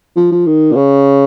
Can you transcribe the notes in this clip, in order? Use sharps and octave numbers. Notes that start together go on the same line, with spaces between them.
F3
F3
D#3
A#2
C#3